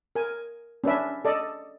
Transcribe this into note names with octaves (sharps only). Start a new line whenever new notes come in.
A#4 G#5
C#4 D4 B4 E5
A4 D5 D#5